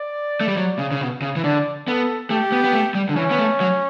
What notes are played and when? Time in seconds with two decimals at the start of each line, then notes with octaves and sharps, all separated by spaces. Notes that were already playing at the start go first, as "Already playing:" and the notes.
Already playing: D5
0.41 A3
0.48 G3
0.57 F#3
0.79 C#3
0.91 C#3
1.01 B2
1.22 C#3
1.36 E3
1.44 D3 D5
1.88 B3 A4
2.30 A3 G4
2.52 B3
2.64 B3
2.73 A3
2.95 G3
3.09 D3
3.16 E3 C#4
3.31 B3
3.38 A3
3.60 F#3